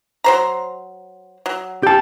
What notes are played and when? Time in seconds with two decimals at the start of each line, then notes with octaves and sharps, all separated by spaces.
0.24 F#3 C5 A#5
1.46 F#3
1.83 G4 A5